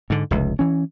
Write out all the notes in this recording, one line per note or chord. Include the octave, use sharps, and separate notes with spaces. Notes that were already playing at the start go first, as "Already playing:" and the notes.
G#2 D3
F1 C#2
E3 C#4